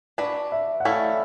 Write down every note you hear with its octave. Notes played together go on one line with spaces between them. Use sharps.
D4 F#4 B4 D5
E5
F#5
A3 C#4 E4 A4 F5